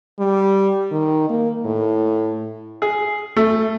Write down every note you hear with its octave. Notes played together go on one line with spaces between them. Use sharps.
G3
D#3
A#3
A2
G#4
A3